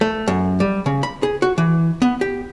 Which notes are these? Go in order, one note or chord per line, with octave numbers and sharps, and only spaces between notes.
A3
F#2
G3
C#3
B5
G#4
F#4
E3
B3
G4